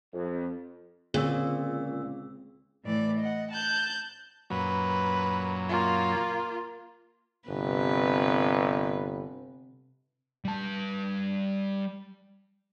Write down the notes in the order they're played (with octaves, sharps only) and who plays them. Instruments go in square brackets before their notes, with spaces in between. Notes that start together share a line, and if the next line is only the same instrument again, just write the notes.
[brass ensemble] F2
[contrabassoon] C#2 [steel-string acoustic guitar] A#2 [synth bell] D3 G#3 E6 [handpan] C4 G#4
[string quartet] A2 E3 D5
D#5 F#5
A5 F#6 G6
[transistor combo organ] F#2 A#2 F#3 [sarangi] B4
[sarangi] A#3 [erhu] F4
[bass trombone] G1 [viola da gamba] C3 B4
[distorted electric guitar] G3 A5